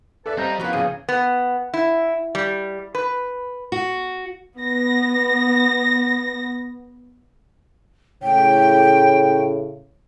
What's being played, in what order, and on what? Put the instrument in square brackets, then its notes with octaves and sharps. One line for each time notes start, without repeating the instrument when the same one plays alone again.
[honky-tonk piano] A4 D5 E5 [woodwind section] B4 A5
[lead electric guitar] G3 [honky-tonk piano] C4 G6 [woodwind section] D#5 F5 A#5
[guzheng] C#3 A#3 [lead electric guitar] F3 [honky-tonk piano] B3 F#4 [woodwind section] E4 B4
[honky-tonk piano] A1 C#3 D#7 [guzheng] F#3 [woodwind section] A#3 C#4 G#4
[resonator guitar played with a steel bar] B3
E4
G3
B4
[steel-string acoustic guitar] F#4
[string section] B3 A#6
[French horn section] A2 C#3 C#5 [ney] G5